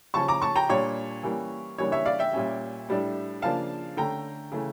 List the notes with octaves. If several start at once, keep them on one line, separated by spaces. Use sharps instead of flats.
C#3 F3 C#4 A5 C#6
A#5 D6
A5 C#6
G5 A#5
A#2 G3 D4 C#5
E3 G3 A#3 C#4
C#3 E3 G3 A#3 D4 C#5
C#5 E5
D5 F5
E5 G5
A#2 G3 C#4
A2 G3 D4
C#3 F3 A#3 D4 F5 A5
D3 A3 C#4 G5 A#5
C#3 E3 A3